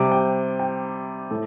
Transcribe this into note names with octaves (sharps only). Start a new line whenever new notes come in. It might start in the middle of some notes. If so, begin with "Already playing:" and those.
Already playing: C3 G3 D6
G5
G5
A2 A4